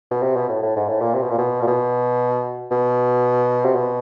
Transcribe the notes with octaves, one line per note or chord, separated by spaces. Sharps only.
B2
C3
B2
A2
A2
G#2
A2
A#2
C3
B2
A#2
B2
A#2
B2
B2
C3
B2